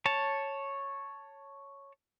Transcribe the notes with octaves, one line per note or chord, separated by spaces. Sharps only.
C#5 A5